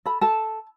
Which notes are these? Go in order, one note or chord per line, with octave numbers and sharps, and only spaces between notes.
A4 B5
A4 A5